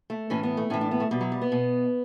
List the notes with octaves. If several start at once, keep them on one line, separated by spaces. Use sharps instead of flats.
A3
A2 E3 C#4
B3
A3
A2 E3 C#4
D4
B3
A3
B2 G3
F#3
G3
B3
B2